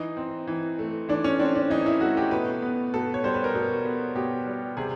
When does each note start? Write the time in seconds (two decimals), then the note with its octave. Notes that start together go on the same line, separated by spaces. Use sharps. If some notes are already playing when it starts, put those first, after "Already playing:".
Already playing: E3 D#4
0.17 C4
0.47 E3
0.79 A3
1.09 E3 D4
1.24 C#4
1.40 C4 D4
1.55 D4
1.70 E3 D#4
1.86 E4
2.01 A3 F#4
2.17 G4
2.31 B2 B4
2.62 B3
2.94 B2 A4
3.14 C#5
3.24 G3 C5
3.34 B4
3.44 A#4
3.54 B2 A4
3.85 B3
4.15 B2 G4
4.47 G3
4.77 C3 G#4